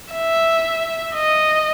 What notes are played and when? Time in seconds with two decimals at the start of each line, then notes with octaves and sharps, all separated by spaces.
0.13 E5
1.14 D#5